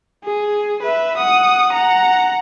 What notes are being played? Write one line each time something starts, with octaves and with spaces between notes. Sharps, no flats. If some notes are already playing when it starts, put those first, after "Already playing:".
G#4
B4 E5
F#5 D#6
F#5 A#5